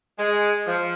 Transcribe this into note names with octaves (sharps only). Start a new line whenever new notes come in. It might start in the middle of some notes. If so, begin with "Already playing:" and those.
G#3
F3